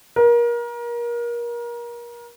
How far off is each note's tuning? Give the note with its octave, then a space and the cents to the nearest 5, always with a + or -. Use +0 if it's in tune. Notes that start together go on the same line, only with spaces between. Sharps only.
A#4 +30